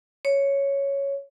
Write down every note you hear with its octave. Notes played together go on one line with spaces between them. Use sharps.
C#5